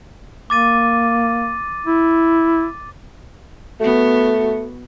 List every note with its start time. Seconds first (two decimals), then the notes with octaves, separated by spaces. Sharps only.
0.50 A#3 D6 A6 D#7
1.86 E4
3.80 A3 B3 F#4